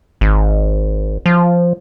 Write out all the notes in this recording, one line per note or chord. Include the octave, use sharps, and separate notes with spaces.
G#1
F3